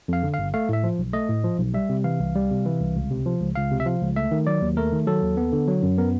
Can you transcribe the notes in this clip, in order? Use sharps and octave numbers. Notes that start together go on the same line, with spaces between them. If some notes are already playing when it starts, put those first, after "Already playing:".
F2 F5
D3
G1 F5
A3 F5
A2 E5
F3
B1
A3 D#5
A2
F3
B1
G3 E5
C3
E3 F5
C2
G3
C3
E3
C2
C#2
C3
F3
C#2
C#2 F5
C3
E5
F3 F5
C#2
A3 E5
D#3
F#3 D5
D#2
A3 A#4
D#3
F#3 A4
D#2
B3
D3
F#3
F#2
B3 A#4